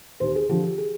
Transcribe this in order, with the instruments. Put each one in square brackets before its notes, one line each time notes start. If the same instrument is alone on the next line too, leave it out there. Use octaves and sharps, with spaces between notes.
[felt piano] D#2 C5
G#4
D3 F3 G4
G4
G#4